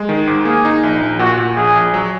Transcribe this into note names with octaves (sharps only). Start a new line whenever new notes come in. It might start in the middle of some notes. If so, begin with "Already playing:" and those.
Already playing: G#3
D#3
G#2
A#3 G#4
D#4
A#1
A#1
A#2 F#4
A#2
A#1 G#4
A#1
F#3